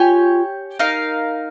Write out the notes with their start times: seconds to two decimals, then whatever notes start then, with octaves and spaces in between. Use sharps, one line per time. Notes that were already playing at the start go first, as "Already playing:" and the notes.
Already playing: F4 G4 C#5 G#5
0.79 D#4 A#4 F5